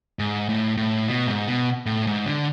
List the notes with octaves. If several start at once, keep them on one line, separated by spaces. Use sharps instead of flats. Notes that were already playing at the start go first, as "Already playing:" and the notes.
G#2
A2
A2
B2
G#2
B2
A2
G#2
D3